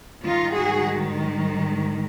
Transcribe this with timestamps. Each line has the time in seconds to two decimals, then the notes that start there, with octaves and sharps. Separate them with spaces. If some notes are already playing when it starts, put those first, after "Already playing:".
0.24 G#2 D#3 G3 D#4 F4
0.54 F#4 G#4